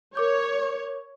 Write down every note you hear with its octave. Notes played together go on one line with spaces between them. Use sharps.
A#4 C#5 D6 G6